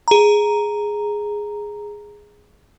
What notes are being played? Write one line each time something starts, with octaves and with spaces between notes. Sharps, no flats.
G#4 A#5